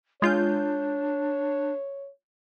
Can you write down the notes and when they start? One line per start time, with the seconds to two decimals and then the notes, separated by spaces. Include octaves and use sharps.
0.22 G#3 D4 F4 C#5 G6